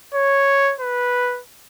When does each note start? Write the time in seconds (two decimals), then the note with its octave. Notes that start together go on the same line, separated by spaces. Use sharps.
0.14 C#5
0.81 B4